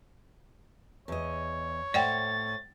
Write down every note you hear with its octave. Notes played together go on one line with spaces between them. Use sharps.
E2 C#5 D#5
A2 C5 D5 F#5 G5 A6